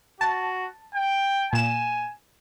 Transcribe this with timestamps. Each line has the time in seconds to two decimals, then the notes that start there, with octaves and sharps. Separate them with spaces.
0.21 F#4 A5
0.95 G5
1.53 A#2 G#5 E7